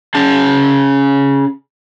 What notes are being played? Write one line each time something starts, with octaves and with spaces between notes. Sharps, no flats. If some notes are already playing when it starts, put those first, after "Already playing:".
C#4 G#4 A5